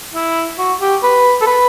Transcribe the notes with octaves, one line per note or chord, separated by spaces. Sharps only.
E4
F#4
G4
B4
A4
B4